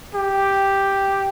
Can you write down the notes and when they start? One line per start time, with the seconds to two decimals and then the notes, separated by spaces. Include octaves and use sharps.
0.15 G4